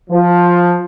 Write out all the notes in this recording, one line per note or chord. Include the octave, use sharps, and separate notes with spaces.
F3